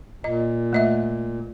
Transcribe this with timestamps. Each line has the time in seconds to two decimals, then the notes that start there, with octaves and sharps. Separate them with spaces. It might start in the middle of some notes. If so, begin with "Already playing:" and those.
0.24 A#2 D#5
0.73 A3 D#5 E5